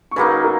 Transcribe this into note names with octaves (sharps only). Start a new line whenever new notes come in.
C#6
C#3 F#3 A#3 D#4 B4 B5
A#4